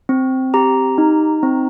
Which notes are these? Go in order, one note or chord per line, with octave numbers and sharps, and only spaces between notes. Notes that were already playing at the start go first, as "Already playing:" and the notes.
C4
G4 A#5
D#4
C4